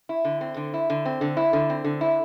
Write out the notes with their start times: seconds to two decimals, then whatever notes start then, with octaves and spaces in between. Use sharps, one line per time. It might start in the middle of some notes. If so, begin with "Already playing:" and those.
0.09 E4
0.25 D3
0.41 C4
0.56 D3
0.74 E4
0.90 D3
1.05 C4
1.21 D3
1.37 E4
1.53 D3
1.70 C4
1.85 D3
2.01 E4